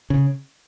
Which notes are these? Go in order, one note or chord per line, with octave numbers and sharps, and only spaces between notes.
C#3